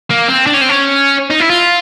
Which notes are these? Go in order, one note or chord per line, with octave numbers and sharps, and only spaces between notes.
A#3
C4
D4
C#4
C4
C#4
D#4
E4
F4